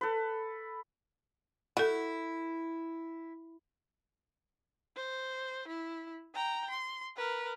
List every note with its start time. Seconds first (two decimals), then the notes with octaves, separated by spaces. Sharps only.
0.01 A4 B4
1.77 E4 F#4 A4 F#5
4.96 C5
5.68 E4
6.35 G5 A#5
6.70 C6
7.16 A#4 B4